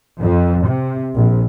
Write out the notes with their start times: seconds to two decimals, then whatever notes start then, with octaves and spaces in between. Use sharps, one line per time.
0.20 F2
0.66 C3
1.14 A#1